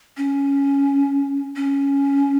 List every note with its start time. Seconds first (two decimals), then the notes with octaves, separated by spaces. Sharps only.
0.17 C#4
1.56 C#4